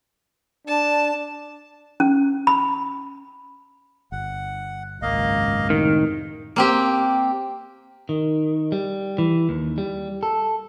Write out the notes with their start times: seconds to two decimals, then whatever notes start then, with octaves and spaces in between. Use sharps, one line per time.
0.67 D4 A5
2.00 C#4
2.47 B5
4.12 G1 F#5
5.02 G#1 C#2 F#2 A#3 D#5 F5
5.70 A2 C3 D#3
6.56 A#3 C4 G4
8.09 D#3
8.72 G3
9.18 E3
9.49 D#2
9.78 G3
10.23 A4